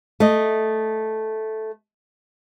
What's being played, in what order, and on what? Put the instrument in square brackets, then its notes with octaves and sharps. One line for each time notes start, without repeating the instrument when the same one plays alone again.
[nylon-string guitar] A3 D#5